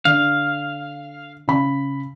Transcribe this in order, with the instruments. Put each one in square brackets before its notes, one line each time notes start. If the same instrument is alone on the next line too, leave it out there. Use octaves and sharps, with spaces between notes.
[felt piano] D3 [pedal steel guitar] F5
[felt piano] C#3 B5